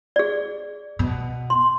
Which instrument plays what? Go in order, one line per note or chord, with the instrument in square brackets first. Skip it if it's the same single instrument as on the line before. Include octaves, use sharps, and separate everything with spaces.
[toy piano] G#4 D5
[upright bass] B2
[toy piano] C6